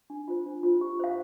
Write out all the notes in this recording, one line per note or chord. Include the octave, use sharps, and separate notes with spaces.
D4
F4 C5
D4
F4 C5
G4
C5 F5